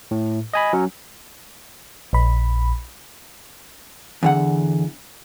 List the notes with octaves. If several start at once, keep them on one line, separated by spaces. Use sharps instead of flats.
A2
D#5 G#5 B5
F#3 C#4
A#1 B5
E2 D3 F#5